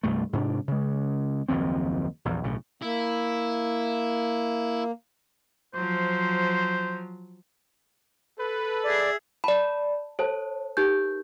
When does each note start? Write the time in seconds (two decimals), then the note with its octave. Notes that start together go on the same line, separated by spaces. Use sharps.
0.03 C2 G2 A3
0.33 G#2 C3 C#4 D4
0.68 C#3 G#3
1.49 F#1 D#2 F3 C4
2.25 A#1 E2
2.44 B1 A2 C#3
2.82 A#3 E4
5.75 F3 F#3 C5
8.37 A4 B4
8.84 G#4 D5 E5
9.44 D5 A5 B5
10.19 A4 C5 C#5 A5
10.77 D#4 G4 A#4 G6